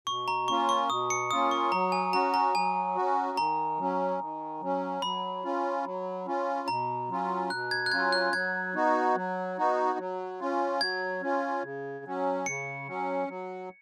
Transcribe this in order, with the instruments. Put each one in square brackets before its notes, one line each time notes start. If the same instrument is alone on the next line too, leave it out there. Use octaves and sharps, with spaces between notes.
[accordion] B2 [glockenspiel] C#6
[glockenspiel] A#5
[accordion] A#3 C#4 F4 [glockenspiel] C#6
[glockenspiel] C#6
[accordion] B2 [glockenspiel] D#6
[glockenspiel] C#7
[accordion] A#3 C#4 F4 [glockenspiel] D#6
[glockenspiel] C#6
[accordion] F#3 [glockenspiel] A#5
[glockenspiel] G#5
[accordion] C#4 F#4 [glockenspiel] A#5
[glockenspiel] A#5
[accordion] F#3 [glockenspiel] G#5
[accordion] C#4 F#4
[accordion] D#3 [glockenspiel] A#5
[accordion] F#3 C#4
D#3
F#3 C#4
[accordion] F#3 [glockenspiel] B5
[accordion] C#4 F4
F#3
C#4 F4
[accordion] B2 [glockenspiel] A#5
[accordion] F#3 C#4 F4
[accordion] B2 [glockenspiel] F#6
[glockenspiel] G#6
F#6
[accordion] F#3 C#4 F4 [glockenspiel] G#6
[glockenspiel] F#6
[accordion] F#3 [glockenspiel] G#6
[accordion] B3 D#4 F#4
F#3
B3 D#4 F#4
F#3
C#4 F4
[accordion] F#3 [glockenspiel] G#6
[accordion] C#4 F4
C#3
F#3 C#4
[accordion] C#3 [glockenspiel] C#7
[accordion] F#3 C#4
F#3